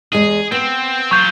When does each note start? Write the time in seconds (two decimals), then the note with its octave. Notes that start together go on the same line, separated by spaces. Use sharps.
0.13 E2 G#3 G#4
0.52 B3 C4
1.11 F#3 F4 C#6 G6